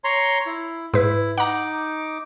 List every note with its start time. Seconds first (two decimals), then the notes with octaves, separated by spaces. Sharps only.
0.04 C#5 A#5 C6
0.46 E4
0.94 G#2 E4 B4
1.38 D#4 F#5 A#5 D6